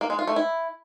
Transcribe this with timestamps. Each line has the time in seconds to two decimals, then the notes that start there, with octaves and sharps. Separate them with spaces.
0.01 A#3
0.10 G#3
0.19 F4
0.27 A3
0.36 E4